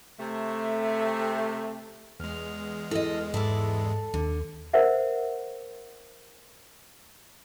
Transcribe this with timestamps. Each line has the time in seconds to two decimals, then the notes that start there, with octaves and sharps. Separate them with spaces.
0.20 C3 A3
2.20 E2 G#3 F6
2.91 E4 A4 D#5
3.34 G#2 E4 A4 D5
4.14 D#2 D3
4.73 A#4 C5 E5 F#5